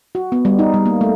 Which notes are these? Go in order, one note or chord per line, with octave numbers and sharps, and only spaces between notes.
F#4
B3
G3
D#4
G3
A#3
A3